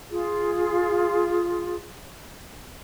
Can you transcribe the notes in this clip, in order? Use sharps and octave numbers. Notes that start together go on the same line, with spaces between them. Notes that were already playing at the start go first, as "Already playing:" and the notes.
F4 G#4